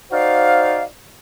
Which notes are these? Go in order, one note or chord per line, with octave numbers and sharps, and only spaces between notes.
D#4 F#4 C5 D5 F5